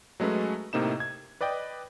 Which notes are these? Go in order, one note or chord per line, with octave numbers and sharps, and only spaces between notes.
F#3 G#3 A3 C#4 B4
A2 C3 A#3 D#4 E7
G#6
B4 D5 D#5 G5